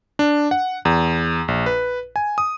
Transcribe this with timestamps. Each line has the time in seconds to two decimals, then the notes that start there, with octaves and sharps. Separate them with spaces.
0.19 D4
0.51 F#5
0.85 E2
1.48 A#1
1.66 B4
2.16 G#5
2.38 D#6